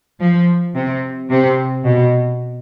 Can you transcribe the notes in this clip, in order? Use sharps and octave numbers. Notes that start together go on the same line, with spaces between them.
F3
C3
C3
B2